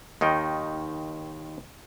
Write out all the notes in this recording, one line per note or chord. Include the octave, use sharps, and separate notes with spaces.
D#2 D#3 D#4 G5